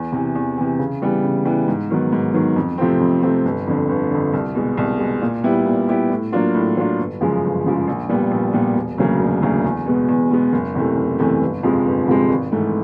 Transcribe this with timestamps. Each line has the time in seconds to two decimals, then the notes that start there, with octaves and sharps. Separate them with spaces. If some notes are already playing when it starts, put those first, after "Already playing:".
Already playing: E2
0.12 C3 E3
0.35 E2
0.58 C3 E3
0.79 C#3
1.02 E3 G3 B3
1.24 C#3
1.45 E3 G3 B3
1.68 G#2
1.90 D#3 F#3 B3
2.12 G#2
2.34 D#3 F#3 B3
2.56 F2
2.78 C3 F3 A3 C4
3.00 F2
3.22 C3 F3 A3 C4
3.45 G1
3.67 F2 D3
3.89 G1
4.11 F2 D3
4.33 C2
4.55 B2 G#3
4.77 C2
4.99 B2 G#3
5.22 A#2
5.44 G3 B3 E4 G4
5.66 A#2
5.88 G3 B3 E4 G4
6.10 A2
6.32 F#3 A#3 D4 F4
6.54 A2
6.77 F#3 A#3 D4 F4
6.99 G1
7.21 F#2 C#3 F3 G#3
7.43 G1
7.66 F#2 C#3 F3 G#3
7.88 A#1
8.09 A#2 G3 B3
8.31 A#1
8.53 A#2 G3 B3
8.75 E1
8.98 D2 C#3 F#3 A#3
9.20 E1
9.42 D2 C#3 F#3 A#3
9.64 E2
9.86 B2 G#3 B3
10.08 E2
10.30 B2 G#3 B3
10.52 F#1
10.75 E2 C3 E3 A3
10.97 F#1
11.19 E2 C3 E3 A3
11.41 G1
11.63 F2 C3 F3 G#3
11.86 G1
12.07 F2 C3 F3 G#3
12.30 G#1
12.52 G#2 E3 A3